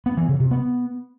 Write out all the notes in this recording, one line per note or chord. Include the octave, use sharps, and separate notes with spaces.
B3
E3
C#3
C3
B3